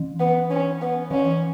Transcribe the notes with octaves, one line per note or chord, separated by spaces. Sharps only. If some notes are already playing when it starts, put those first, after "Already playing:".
Already playing: E3
B3
C#4
B3
E3 C#4